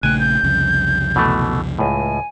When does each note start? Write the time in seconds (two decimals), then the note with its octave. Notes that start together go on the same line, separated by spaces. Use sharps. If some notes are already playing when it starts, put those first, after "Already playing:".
0.03 A#1 C#3 A3 G5 G#5 F#6
0.19 G6
0.43 C2 F2 C#3
1.16 B2 E3 A3
1.79 C#2 A2 G#5